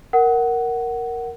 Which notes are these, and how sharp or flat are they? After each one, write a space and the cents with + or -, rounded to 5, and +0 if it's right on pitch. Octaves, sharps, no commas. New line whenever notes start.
A#4 +0 F#5 +15